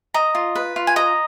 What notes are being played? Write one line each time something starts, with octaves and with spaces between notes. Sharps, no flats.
D#5 A#5
F4
B4
F4
G#5
D#5 A#5